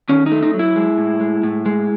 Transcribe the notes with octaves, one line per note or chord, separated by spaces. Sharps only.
D#3 C#4
D#4
A3
D#4
F#3
E4
G#3
A2
G#3
A2
G#3